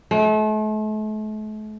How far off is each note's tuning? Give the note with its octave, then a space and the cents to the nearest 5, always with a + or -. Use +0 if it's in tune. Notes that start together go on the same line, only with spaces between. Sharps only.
A3 -40